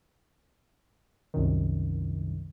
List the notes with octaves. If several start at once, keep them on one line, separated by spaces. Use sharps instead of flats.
C2 F#2 D#3